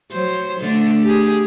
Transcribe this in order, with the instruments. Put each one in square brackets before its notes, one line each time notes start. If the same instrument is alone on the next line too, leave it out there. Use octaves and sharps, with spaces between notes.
[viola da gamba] F#3 C5
D3 A3 D4
G4 G#4